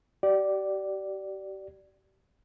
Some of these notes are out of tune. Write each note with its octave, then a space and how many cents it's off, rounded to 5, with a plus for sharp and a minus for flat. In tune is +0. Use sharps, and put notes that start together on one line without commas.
G4 -35 D5 +0